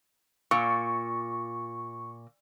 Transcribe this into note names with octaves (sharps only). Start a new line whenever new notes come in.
A#2 C#6